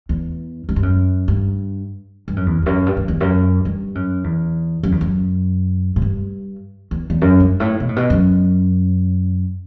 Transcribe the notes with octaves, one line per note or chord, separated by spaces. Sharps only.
E2
F#2
G2
F#2
G2
G2
F#2
E2
E2
F#2
G2
F#2
E2
F#2
G2
F#2
E2
F#2
E2
F#2
A2
G2
E2
E2
F#2
G2
A2
B2
A2
B2
F#2